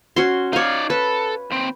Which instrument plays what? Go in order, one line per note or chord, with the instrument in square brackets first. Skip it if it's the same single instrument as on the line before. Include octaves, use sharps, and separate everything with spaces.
[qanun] C#4 F#4 C6
[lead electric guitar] D#4 D5 [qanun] C#5 F5
[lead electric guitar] A4 [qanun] B4
[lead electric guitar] D#2 C4